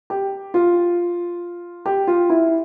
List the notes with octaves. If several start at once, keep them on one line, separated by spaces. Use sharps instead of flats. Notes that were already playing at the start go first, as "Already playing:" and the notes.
G4
F4
G4
F4
E4